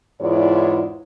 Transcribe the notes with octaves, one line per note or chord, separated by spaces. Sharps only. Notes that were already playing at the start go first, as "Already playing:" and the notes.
E2 G#2 E4 F4 C#5 D5